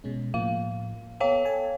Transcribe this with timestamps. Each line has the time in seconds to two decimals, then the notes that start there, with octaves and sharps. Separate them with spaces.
0.04 B2 G#3 C#4
0.34 A2 F3 A#3 F5
1.20 B3 A4 C#5 F5 G5
1.45 A4 G#5 A5